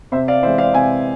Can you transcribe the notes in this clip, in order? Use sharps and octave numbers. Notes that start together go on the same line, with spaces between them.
C3 C5 E5
D5 F5
E3 G#3 C5 E5
D5 F5
C3 E5 G#5